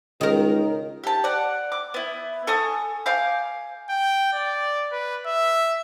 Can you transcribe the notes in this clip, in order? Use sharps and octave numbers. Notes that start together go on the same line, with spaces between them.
C#2 D#3 A#4
G4 A5
D5 F#5
D6
B3 E4
A4 G#5 C#6 D#6
F5 G#5 D6 G6
G5
D5
B4
E5